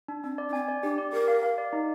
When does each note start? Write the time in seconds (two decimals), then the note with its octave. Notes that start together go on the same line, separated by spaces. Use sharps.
0.08 D4
0.24 C4 D4
0.38 D5
0.49 D4
0.53 C4 G#5
0.68 D5
0.83 D4 G4
0.98 D5
1.13 G4 A#4
1.28 F5
1.43 F5
1.58 D5
1.73 D#4